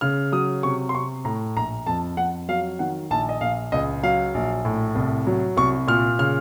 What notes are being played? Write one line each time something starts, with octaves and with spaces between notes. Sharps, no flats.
C#3 F6
F#3 D#6
C3 C#6
C6
C3 C#6
A2 A#5
A#1 A#5
F2 A5
F2 F#5
F#3 F5
D#3 F#5
A#1 A5
D#5
A#1 F5
C#2 D#5
F#3 F5
A#1
A2
C2
F#3
C2 C#6
A#2 F6
C#3 F6